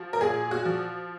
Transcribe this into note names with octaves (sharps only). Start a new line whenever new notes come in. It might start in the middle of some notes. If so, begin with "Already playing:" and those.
Already playing: F3 F#4
A#4
A#2 G#4
F#4
F3